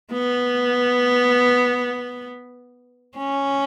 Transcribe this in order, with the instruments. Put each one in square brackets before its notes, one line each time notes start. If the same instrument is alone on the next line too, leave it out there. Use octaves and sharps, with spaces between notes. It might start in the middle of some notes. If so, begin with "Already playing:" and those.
[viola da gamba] B3
C#4